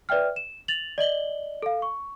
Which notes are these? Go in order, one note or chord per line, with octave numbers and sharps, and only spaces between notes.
B4 D5 E5 G5 F6
E7
A6 F7 F#7
D5 D#5 F#7 G7
A4 F5
C#6